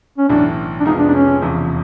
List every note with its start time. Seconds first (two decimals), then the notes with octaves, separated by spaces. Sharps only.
0.18 C#4
0.28 B1 A2 E3 D4
0.80 D4
0.85 F2 C3 F3 G#3 B3 D#4
0.99 D4
1.09 D4
1.14 C#4
1.42 E1 E2 C3 F3